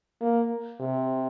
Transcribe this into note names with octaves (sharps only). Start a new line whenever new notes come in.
A#3
C3